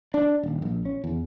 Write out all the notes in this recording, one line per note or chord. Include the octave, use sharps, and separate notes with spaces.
D4
D#1
A#1
C#4
E2